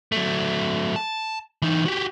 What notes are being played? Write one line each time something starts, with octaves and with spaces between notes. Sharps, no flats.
F#3 A3
A5
E3 D#4
F#4 G4